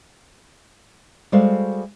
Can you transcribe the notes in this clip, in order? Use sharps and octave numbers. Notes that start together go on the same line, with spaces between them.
G3 G#3 F#4 A4 C5 F5